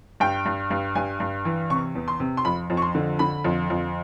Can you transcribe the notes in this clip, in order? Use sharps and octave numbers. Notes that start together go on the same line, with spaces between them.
G2 G5
G2
G2
G2 G#5
G2
E3
C3 C#6
E2
C6
C3
C6
F2 B5
F2
C#6
C6
D3
D3 B5
F2
F2